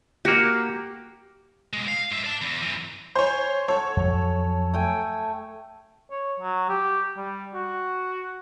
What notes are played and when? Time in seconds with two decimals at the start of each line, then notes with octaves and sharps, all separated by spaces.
0.25 A#3 F#4 G4
1.73 B2 G#3
1.88 F5
2.11 G#2 E5
2.24 D5 A5
2.42 E2
2.62 F#2 E3
3.15 C5 C#5 G#5
3.68 A4 C#5 F#5 C#6
3.97 F2 F#3
4.74 A3 G5 G#5
6.11 C#5
6.40 F#3
6.69 G4
7.17 G3
7.54 F#4